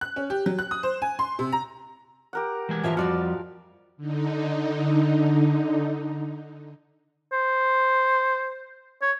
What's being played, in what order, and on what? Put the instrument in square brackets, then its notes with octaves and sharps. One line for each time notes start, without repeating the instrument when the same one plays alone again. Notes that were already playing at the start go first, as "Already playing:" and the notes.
[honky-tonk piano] F#6
C#4
G4
F#3
F#6
D#6
C5
G#5
C6
C3
A#5
[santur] G4 A#4 F#5
[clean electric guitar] E3 G#3 G#5
[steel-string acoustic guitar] A#2 E5 A#5 [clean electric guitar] E3 F5 G#5 [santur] F3
[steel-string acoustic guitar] F2 F3 G3 [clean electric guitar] F#4 [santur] D5 F5
[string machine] D3 D#4
[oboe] C5
C#5